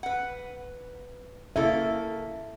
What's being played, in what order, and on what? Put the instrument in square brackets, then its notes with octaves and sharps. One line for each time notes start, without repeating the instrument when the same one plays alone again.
[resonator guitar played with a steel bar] B4 F#5
[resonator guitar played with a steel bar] C#3 A#3 A4 [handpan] E4 E5